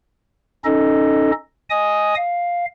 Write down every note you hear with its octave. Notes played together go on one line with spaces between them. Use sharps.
C#4 D#4 A4 D#5
D#5 G#5 D#6
F5